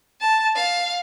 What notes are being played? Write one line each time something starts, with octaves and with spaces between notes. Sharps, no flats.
A5
F5